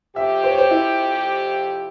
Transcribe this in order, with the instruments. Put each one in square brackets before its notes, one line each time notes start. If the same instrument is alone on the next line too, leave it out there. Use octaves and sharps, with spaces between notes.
[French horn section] F2 C3 F3 C4 G4 [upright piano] E5
[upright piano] C5
C#5
C5
E4